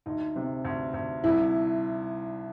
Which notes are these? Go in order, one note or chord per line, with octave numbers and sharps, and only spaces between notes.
D2 D#4
C3
D2
D2
C2 E4